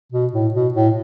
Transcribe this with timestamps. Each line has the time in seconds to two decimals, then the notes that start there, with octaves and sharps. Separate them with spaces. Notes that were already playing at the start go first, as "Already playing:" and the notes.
0.12 B2
0.33 A2
0.54 B2
0.74 A2